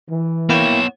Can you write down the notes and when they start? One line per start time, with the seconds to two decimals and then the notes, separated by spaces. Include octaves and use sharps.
0.11 E3
0.49 A#3 B3 E4 C#5 G5 E7